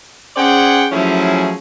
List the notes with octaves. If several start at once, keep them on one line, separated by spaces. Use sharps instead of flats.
C#4 G#4 C5 D5 F#5 G5
F3 F#3 A3 C#4 E4 G#4